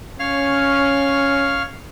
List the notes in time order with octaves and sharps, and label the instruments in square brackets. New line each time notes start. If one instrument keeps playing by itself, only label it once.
[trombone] C#4 [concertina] C#5 F5 F6